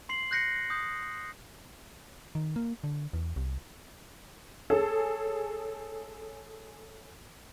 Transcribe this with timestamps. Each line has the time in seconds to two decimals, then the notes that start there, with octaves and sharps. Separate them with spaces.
0.09 C6 C7 F#7
0.31 F#6 G6 A#6 C7 C#7
0.70 D#6 G6
2.35 D#3
2.56 A#3
2.84 D3
3.13 E2
3.36 C2
4.70 G#4 A4 C#5